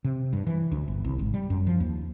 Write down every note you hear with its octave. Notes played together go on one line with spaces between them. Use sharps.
C3
G2
E3
D2
G1
C2
G#1
G3
F#2
F3
D#2